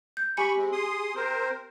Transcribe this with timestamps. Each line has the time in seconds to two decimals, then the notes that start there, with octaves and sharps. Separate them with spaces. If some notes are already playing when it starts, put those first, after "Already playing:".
0.17 G6
0.37 G4 G#5 B5 C#6 C#7
0.56 G#3 C4
0.72 G#4 C6 D#6
1.15 C4 A#4 C5